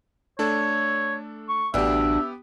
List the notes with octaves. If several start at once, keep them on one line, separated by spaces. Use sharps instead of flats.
A3 D4 A4 C#5
C#6
A1 D2 B3 D4 G4 E5